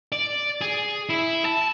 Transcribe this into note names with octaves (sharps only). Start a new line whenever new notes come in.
D5
G#4
E4
A5